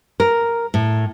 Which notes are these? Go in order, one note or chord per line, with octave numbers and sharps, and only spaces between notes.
A#4
A2